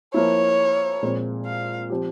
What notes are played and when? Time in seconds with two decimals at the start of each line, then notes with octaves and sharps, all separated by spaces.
0.14 F3 A#3 E4 C#5
1.03 A#2 F3 G#3 C4
1.46 F5
1.90 F3 C4 G4